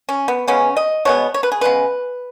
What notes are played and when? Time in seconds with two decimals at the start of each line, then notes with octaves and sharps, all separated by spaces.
0.09 C#4
0.28 B3
0.48 C#3 G#3 B3 C#4
0.77 D#5
1.05 B2 G#3 B3 C#5
1.34 C#5
1.43 B4
1.52 G#4
1.61 C#3 G#3 B3 B4